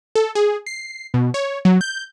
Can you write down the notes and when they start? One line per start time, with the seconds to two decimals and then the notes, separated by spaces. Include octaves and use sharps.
0.15 A4
0.35 G#4
0.67 C7
1.14 B2
1.34 C#5
1.65 F#3
1.81 G6